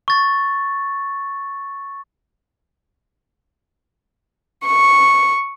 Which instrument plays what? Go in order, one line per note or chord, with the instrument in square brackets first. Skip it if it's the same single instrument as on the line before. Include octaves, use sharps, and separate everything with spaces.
[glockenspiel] C#6 A6
[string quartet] C#6